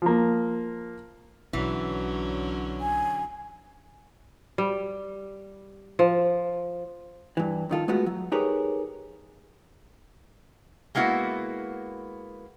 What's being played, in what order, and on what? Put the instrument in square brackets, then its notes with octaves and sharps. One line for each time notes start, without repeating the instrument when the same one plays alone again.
[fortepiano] F3 A#3
[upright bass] B1 [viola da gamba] D3 F#3 C#4 [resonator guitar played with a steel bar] E3
[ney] G#5
[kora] G3
F3
[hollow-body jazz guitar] G2 E3
F#2 D#3 F4 A4
G#3 A3 B3 F4 F#4
F#3
D#4 G4 G#4 A#4 B4 C#5
[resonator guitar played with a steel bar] G#3 A#3 B3 E4 F#4